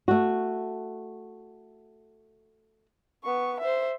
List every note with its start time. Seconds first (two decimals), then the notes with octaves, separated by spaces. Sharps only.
0.08 A3 F#4
3.24 B3 C#6
3.60 C5 E5